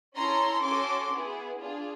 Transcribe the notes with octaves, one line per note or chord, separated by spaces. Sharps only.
C#4 E4 A4 A#5 C6
C#4 F#4 A4 C6 D6
B3 E4 G#4
D4 F4 G#4